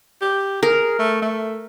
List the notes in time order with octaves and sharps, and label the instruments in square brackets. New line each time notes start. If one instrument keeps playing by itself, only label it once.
[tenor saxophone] G4
[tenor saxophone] G#4 [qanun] A#4
[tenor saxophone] A3
A3